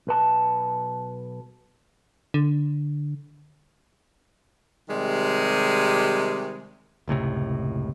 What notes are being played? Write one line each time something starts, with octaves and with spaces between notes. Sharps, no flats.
B1 B4 A5
D3
C3 D#3 G3 G#3
F#1 C#2 A2 C3